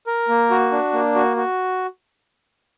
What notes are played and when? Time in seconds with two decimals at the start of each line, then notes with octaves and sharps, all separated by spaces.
0.07 A#4
0.29 A#3
0.51 F#4
0.72 D4
0.93 A#3
1.15 F#4
1.37 F#4